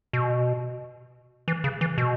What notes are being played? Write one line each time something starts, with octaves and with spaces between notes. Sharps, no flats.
B2
E3
C#3
E3
B2